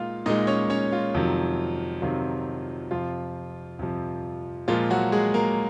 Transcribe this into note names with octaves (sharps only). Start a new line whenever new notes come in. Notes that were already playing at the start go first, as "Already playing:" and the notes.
Already playing: A#2 G#3 D#4 F4 F5
A#2 G#3 D#4 D#5
C#4 C#5
C#4 C#5
F4
F2 C3 D#3 F#3
F2 C3 D#3 F#3 F4
F2 C3 F3 F4
F2 C3 F3
A#2 F3 G#3 F4
F#3 F#4
G#3 G#4
A#3 A#4